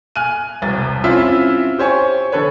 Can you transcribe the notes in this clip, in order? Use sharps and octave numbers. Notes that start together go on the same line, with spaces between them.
G#5 F6 F#6 D#7
E1 C2 A6
C4 C#4 E4 F4 E5
G4 C5 C#5 G#5 C#6
D3 A4 B4 C#5